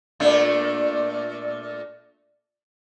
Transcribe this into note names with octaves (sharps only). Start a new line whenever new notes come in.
A#2 A3 D4